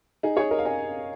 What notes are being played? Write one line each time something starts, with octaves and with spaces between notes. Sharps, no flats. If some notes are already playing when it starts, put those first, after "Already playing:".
D#4 G#4
G#4 C#5
A#4 D#5
F5
D#5 G#5